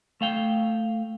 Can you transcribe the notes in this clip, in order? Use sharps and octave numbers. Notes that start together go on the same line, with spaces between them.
A3 F5 G5